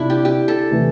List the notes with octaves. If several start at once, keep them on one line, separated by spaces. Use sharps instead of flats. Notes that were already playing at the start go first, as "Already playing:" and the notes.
Already playing: C3 D4 E4
G4
G4
A4
C3 E3 A3